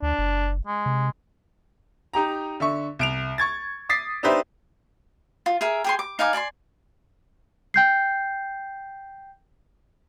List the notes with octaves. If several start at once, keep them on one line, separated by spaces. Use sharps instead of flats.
D2 D4
F#1
G#3
C3
D#4 G4 A#5
D3 E5 C#6
C2 D7 F7
C#6 G#6 A6
D6 D#6 A6 B6 C7
D4 D#4 G4 B4 C5 E5
F4
G#4 A#4 E5
G4 G#4 C6
D6
D#4 F5 G#5 D6
D5 G#5 A5 C6
G5 G6 C7